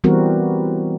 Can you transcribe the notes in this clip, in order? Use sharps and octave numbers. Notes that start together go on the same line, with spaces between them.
E3 G3 B3 C4 F#4 A#4